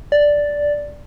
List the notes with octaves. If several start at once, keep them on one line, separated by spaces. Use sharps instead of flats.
D5